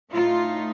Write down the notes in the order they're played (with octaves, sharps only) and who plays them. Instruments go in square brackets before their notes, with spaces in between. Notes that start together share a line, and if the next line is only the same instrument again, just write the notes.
[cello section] A2 A3 D#4 F4